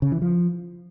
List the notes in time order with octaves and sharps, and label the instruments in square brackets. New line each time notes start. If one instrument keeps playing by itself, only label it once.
[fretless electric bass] C#3
E3
F3